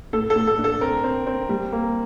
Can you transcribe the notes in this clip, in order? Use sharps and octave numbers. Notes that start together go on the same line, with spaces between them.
A2 A4
A4
A2
A4
D4
A4
C4 A#4
C4
C4
G3
A#3